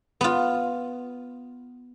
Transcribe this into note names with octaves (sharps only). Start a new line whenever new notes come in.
B3 F4